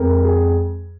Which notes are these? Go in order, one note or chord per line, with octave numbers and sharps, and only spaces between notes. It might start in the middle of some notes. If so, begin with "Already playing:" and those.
Already playing: F2 G#3 A#4
G#4